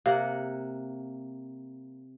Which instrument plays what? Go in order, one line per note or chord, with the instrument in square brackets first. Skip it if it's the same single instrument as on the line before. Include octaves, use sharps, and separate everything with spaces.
[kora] C3 A#3 F#5 [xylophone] F5